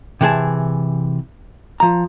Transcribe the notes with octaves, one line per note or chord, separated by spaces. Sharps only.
C3 E3 G#4 A5
F3 A#5